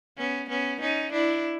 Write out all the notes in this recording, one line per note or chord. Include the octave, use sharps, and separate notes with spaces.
B3 C#4
B3 C#4
C#4 D#4
D4 E4